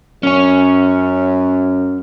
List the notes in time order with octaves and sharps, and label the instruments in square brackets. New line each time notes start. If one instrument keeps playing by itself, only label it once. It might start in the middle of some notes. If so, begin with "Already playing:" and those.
[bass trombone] F#2 [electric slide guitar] C#4 C#5